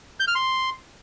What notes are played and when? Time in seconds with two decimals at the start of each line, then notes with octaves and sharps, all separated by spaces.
0.20 G6
0.28 F6
0.35 C6